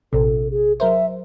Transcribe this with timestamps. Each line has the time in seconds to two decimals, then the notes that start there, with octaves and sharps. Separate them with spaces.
0.13 A#1 C3 A4
0.51 G#4
0.80 F#3 A#4 C5 E5